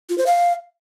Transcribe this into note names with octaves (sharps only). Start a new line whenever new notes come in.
F4
C5
F5